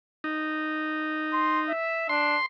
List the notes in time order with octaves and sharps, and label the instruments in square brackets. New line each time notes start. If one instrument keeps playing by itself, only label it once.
[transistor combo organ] D#4
[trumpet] C6
E5
[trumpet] D4 [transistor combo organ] C6